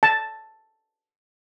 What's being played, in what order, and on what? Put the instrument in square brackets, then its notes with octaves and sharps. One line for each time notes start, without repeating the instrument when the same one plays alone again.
[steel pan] A5